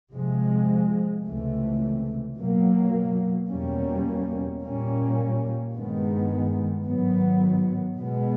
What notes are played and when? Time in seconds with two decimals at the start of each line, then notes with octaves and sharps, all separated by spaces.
0.13 C3 F3 G#3
1.25 C#2 C3 E3 A3
2.38 B2 F#3 A#3
3.49 E2 B2 G3 A#3 C#4
4.62 A#2 G3 A#3 C#4
5.74 G2 D#3 G#3 B3
6.86 G#2 D#3 F#3 B3
7.99 B2 G#3 B3